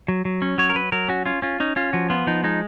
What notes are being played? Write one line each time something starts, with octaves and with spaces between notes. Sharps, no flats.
F#3
F#3
C#4
F#3 C#5
A#4
F#3 B4
F#3 A#4
C#4 F#4
C#4 F4
C#4 F4
C#4 D#4
C#4 F4
F3 F#4
B3 F4
F3 D#4
G#3 D#4